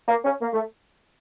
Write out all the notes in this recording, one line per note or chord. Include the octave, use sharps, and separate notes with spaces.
A#3
C#4
A#3
A3